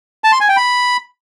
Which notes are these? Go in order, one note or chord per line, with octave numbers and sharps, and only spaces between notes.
A5
C6
G#5
G5
B5